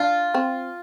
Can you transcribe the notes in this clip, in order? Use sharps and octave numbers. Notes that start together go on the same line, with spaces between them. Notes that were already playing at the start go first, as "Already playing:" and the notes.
Already playing: D4 F4
C4